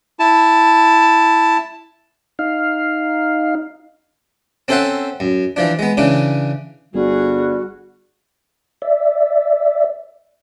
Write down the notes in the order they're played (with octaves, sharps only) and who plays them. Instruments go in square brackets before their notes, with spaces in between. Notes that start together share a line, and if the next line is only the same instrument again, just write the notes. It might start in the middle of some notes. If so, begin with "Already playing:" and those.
[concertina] E4 A5
[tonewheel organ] D#4 F5
[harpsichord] C4 C#4 A4 C5 E5 F#5
F#2
E3 F3 D4
G#3 B3
C#3 E3 C#4 D4
[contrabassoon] G1 [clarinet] G3 [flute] F#4 [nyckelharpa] G#4
[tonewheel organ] D5 E5